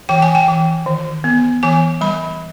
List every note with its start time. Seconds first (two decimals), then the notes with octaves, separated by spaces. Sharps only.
0.09 E3 G5
0.22 G#5
0.35 G5
0.48 E3
0.86 D#3
1.24 B3
1.63 E3 G#5
2.01 G3 B5